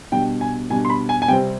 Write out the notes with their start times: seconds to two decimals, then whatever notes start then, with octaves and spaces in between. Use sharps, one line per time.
0.12 B2 G3 D4 G5
0.41 G#5
0.70 B2 G3 D4 G#5
0.85 C6
0.90 B5
1.09 G#5
1.22 G#5
1.28 C3 G3 C4 G5